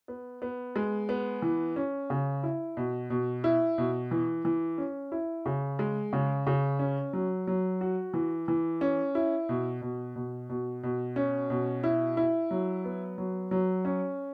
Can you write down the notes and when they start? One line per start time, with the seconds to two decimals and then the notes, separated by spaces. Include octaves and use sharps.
0.08 B3
0.42 B3
0.76 G#3
1.09 B3
1.42 E3
1.76 C#4
2.10 C#3
2.43 E4
2.77 B2
3.10 B2
3.44 E4
3.78 B2
4.11 E3
4.45 E3
4.78 C#4
5.12 E4
5.46 C#3
5.79 G#3
6.13 C#3
6.47 C#3
6.79 C#4
7.13 F#3
7.47 F#3
7.81 F#4
8.14 E3
8.48 E3
8.81 C#4
9.15 E4
9.49 B2
9.82 B2
10.16 B2
10.50 B2
10.83 B2
11.16 C#4
11.50 B2
11.84 E4
12.17 E4
12.51 F#3
12.85 B3
13.18 F#3
13.51 F#3
13.85 C#4